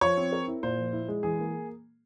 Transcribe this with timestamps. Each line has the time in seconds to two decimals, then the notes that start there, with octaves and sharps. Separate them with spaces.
0.01 F3 C#5
0.17 C4
0.32 A#4
0.48 E4
0.63 A#2 C5
0.78 F3
0.93 E4
1.08 G#3
1.23 E3 G#4
1.39 A#3